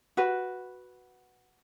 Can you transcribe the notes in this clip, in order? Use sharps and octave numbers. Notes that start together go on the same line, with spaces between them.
F#4 B4